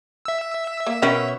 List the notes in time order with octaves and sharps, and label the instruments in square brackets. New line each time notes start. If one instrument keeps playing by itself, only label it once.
[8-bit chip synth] E5 E6
[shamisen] A#3
[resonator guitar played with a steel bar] B2 C#4 [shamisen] A#4 G5 [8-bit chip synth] E5